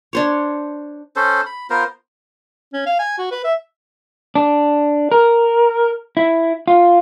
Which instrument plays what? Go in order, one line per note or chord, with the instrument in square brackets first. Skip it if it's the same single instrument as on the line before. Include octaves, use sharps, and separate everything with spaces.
[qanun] D4 C5 C#5
[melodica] C#4 A4 C5
B5
B3 F4 A#4 C5
[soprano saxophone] C#4
F5
G#5
F#4
B4
E5
[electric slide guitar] D4
A#4
E4
F4